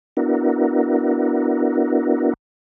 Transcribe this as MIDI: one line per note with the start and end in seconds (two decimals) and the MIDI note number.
0.17 2.33 59
0.17 2.33 62
0.17 2.33 64
0.17 2.33 66
0.17 2.33 70